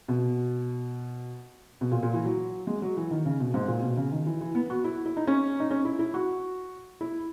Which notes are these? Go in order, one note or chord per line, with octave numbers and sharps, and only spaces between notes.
B2
B2
A#2
A#2
E3
F#3
G#3
F#3
E3
D#3
C#3
B2
G#2
A#2
B2
C#3
D#3
E3
E3
B3
F#4
E4
E4
D#4
C#4
D#4
C#4
E4
E4
F#4
E4